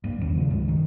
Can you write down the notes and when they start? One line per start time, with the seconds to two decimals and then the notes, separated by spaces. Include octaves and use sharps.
0.04 G2 A#3
0.21 E2 D#3 C#4
0.35 C#3 F3 G3
0.51 C#2 G2 D#3 G#3
0.68 D#3